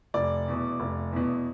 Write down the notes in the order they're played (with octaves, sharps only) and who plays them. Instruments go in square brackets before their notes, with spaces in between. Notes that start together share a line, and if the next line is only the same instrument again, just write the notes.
[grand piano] F1 D5
E2 B2
F1
E2 B2